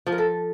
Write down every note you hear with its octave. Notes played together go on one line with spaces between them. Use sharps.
F3
A#4
A4